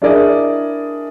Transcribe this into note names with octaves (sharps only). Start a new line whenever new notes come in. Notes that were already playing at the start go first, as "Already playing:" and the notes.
D4 E4 G#4 A#4 D5 D#5